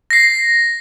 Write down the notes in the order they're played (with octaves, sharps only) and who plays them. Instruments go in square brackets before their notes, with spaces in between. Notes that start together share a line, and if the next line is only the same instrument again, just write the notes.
[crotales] A#6 C7